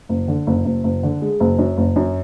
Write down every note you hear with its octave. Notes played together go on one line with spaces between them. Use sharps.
F#1
D3
F#1
F#1
F#1
D3
G#3
F#1
F#2
F#1
F#2